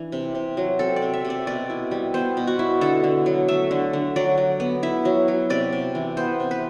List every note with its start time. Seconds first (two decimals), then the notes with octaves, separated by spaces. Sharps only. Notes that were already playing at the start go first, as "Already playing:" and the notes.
Already playing: E3 D4
0.12 C3
0.35 C3
0.57 F#3
0.79 C4 A4
0.96 D5
1.02 C3
1.14 E5
1.25 C3
1.30 D5
1.47 B2 D5
1.70 E4
1.91 G3
2.14 B3 C5
2.37 B2
2.47 F#4
2.59 E4
2.81 D3 A4
3.04 D3
3.26 F#3
3.48 A3 E5
3.71 D3
3.93 D3
4.16 F#3 D5
4.38 F#3
4.60 B3
4.83 E4 E5
5.05 F#3
5.28 F#3
5.50 C3 D5
5.73 C3
5.95 E3
6.17 B3 C5
6.40 C3
6.51 B4